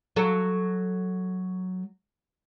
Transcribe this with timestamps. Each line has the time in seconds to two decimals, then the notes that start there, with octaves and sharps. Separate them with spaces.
0.16 F#3 A4